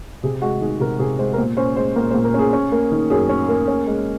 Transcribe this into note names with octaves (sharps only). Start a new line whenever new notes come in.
C3 G#4
G#3 F#4
D#3 G#4
C3 A#4
C3 G#4
G#3 C5
A#4
A#2 C5
C#4 C5
G#3 C5
A#2 A#4
C5
A#2
A#4
C#4 G#4
C#4
A#3
D#3
F#2 G#4
C#4
A#3
C#4
G#3